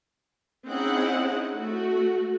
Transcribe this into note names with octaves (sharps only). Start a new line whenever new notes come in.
C4 C#4 D#4 E4 G#4 F#5
A3 F#4